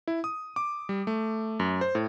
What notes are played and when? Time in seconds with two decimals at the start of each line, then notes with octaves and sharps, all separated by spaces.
0.08 E4
0.24 D#6
0.56 D6
0.89 G3
1.07 A3
1.60 F#2
1.81 C5
1.95 A2